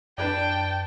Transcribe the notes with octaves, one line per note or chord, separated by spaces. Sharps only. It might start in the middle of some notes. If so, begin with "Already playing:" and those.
F#2 D4 B4 D5 G5 A5